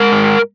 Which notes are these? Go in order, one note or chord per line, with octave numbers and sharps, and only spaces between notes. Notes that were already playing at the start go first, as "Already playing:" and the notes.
Already playing: G#3 A#4
G#2